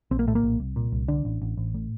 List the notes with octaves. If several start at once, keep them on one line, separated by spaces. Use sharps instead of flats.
A#1 C4
A#3
A2 A3
A#3
A#1
C2
A#2
C2
D3 D4
A1
A1
A1
A2